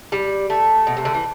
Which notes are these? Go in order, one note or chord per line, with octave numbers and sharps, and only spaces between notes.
G3
A3
B2
C3
D3
E3